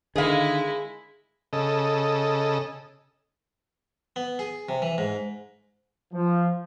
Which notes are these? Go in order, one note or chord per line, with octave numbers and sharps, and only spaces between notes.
D3 D#3 G#3 E4 G#4 F5
C#3 A4 D#5
B3
G#4
C3
E3
G#2
F3